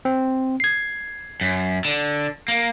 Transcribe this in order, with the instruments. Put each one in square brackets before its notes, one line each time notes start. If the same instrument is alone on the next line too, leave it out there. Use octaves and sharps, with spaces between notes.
[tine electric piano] C4
G#6 C7
[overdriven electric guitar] F#2
D3
A#3